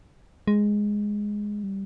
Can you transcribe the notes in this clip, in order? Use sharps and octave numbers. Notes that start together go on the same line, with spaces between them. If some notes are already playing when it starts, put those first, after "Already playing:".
G#3
G3